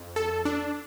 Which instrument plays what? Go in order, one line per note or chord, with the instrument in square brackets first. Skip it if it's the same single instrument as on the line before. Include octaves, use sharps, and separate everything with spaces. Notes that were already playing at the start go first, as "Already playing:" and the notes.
Already playing: [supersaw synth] F2
A4
D4